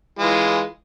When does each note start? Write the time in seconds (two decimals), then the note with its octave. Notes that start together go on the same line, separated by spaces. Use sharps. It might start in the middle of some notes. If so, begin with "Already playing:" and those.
0.19 E3 G#3 F4